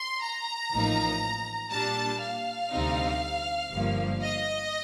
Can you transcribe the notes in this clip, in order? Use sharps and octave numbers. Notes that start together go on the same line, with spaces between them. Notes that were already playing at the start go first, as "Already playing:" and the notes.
Already playing: C6
A#5
A1 A2 F3 A#3 D#4
A#2 G3 D4 A5
F5
D2 C3 G3 C4 D#4
G1 G2 F3 A#3
D#5